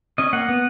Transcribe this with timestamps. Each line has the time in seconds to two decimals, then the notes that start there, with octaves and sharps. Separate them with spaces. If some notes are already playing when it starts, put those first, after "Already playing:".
0.18 C#4 D#5
0.33 A#3 F#5
0.49 B3